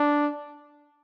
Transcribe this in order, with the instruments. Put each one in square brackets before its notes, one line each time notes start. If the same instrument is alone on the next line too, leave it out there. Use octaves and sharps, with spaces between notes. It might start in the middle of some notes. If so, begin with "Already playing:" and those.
Already playing: [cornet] D4